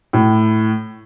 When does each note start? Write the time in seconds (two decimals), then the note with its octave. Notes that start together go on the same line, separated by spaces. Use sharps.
0.13 A2